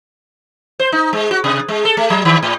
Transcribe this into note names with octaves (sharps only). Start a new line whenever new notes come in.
C5
D#4
G#3
F#4
C3
G#3
A4
A3
F#3
D#3
A2